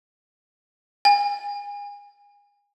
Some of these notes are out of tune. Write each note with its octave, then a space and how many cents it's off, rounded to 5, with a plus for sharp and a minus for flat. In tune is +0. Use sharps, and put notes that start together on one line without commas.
G#5 -30